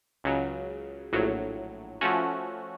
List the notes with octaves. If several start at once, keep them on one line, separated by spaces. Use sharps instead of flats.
C#2 C#3 F#3
A#1 A2 F#3
F3 A3 C#4 F#4